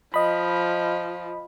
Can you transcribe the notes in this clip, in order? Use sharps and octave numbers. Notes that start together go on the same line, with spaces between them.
F3 D#5 B5